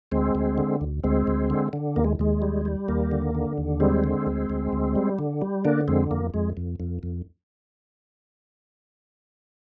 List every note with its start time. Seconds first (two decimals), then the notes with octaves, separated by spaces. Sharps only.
0.12 D2 G#3 C4
0.35 D2
0.58 D3
0.81 D2
1.04 D2 G#3 C4
1.27 D2
1.50 D3
1.73 D3
1.96 D#2 A#3
2.04 G#3
2.19 D#2 G#3
2.42 G3
2.65 G3
2.88 D#2 A#3
3.11 D3
3.35 D3
3.58 D#2
3.80 G3 G#3 C4
4.04 D3
4.26 D2
4.50 D2
4.73 D2
4.95 G3
5.19 D3
5.42 G3
5.65 D3 A#3 D4
5.88 F2 G#3 C4
6.11 F2 A#3
6.34 F2 G#3
6.57 F2
6.80 F2
7.03 F2